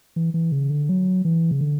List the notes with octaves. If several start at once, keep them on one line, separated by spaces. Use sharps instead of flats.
E3
E3
C#3
D3
F#3
E3
C#3
D3